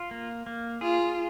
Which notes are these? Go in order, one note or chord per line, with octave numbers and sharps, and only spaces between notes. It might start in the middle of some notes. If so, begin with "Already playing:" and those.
Already playing: F4
A#3
A#3
F4 G#4